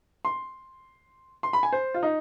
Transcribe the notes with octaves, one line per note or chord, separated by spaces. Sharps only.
C6
C6
B5
G#5
C5
F4
D#4